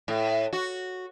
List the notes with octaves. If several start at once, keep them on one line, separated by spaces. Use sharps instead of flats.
A2
F#4